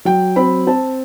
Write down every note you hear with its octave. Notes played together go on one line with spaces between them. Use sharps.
F#3 G5
C4 B5
C4 A5